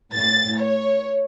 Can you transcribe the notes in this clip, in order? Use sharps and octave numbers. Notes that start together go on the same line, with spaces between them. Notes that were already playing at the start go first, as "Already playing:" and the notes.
A2 A6
C#5